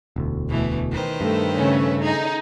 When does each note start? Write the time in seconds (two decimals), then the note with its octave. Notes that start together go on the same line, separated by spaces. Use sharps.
0.16 E1 D2
0.48 B2 E3 A3
0.91 D#3 B4 C5
1.21 G2 A3
1.55 C#3 A3 C#4
2.02 D#4 G#4